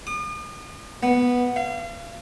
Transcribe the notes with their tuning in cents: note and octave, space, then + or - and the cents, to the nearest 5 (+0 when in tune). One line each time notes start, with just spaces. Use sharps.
D#6 -45
B3 -5
F5 -35